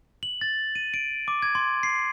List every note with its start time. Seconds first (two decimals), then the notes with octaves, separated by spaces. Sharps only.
0.23 F#7
0.41 A6
0.75 D#7
0.94 D7
1.28 D6
1.42 G#6
1.55 C6
1.83 C7